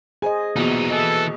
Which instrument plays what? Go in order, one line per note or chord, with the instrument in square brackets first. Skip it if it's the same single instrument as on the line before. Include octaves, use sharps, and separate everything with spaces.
[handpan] G#4 C5 D#5 [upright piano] G#5
[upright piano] A#1 E2 B2 [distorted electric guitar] E3 D#4
[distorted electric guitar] E3 [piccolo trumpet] A4 [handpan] D#5